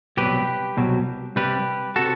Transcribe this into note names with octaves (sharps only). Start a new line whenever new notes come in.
C2 B2 F#3 G4 B4
C2 B2 F#3
C2 C3 G3 G4 B4
C3 F#4 A4